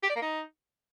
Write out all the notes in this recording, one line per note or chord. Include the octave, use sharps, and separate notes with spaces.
G4
D5
A#3
D#4